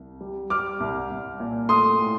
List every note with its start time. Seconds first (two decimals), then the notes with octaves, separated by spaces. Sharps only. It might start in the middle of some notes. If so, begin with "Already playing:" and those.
Already playing: C2
0.21 G3
0.50 G3 D6 F6
0.80 C2
1.10 C2
1.40 A#2
1.69 A3 C6 D#6
1.99 A2